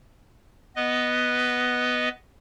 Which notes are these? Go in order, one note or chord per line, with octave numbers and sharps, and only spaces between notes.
B3 B4 D#5